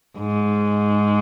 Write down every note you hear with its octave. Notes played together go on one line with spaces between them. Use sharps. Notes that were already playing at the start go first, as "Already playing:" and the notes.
G#2